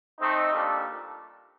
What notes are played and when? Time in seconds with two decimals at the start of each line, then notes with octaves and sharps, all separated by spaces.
0.20 A3 C4 D#4
0.52 A#2 G3 D4 A4